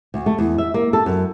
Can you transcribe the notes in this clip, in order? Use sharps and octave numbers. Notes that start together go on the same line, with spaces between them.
D2
A3
E2
E5
A#3
A4
F#2